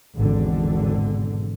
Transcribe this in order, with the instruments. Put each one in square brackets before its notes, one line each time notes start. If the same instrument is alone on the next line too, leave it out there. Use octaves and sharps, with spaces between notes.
[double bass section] G#1 E2 B2 D3